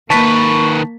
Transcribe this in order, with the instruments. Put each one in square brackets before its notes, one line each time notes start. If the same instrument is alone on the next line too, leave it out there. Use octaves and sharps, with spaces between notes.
[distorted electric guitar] D#3 B4 [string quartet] A#3 [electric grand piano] A5 B6 [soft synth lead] C#6